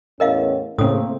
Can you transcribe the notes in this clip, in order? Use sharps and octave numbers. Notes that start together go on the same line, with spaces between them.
E2 A2 C#4 A#4 D#5 F5
A2 C#3 A3 A#3 C4 D#6